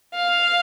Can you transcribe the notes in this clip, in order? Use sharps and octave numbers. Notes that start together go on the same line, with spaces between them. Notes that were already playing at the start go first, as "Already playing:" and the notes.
F5